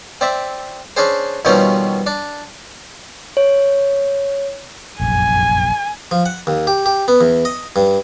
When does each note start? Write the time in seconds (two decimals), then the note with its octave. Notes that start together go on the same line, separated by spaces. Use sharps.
0.21 C4 D5 E5
0.97 C#4 D4 G#4 C5
1.45 D#2 B2 F3 G3 C4 C#4
2.06 D4
3.37 C#5
4.99 F1 A#1 F#2 G#5
6.11 F3
6.26 F#5
6.47 D#2
6.67 G4
6.86 G4
7.08 B3
7.21 E2
7.45 D#5
7.76 G2